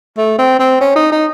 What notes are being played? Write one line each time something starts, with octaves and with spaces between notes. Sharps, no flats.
A3
C4
C4
C#4
D#4
D#4